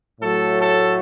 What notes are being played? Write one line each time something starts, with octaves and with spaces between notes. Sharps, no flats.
A2 F#3 A3 A4
A4